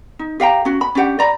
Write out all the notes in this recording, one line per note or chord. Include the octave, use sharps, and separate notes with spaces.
D#4
G4 F5 G5 A#5
C#4 F#4
B5
C#4 D4 G4 F#5
D5 A#5 B5